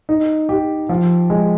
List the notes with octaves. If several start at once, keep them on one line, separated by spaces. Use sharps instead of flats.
D#4
G4
F3
G#3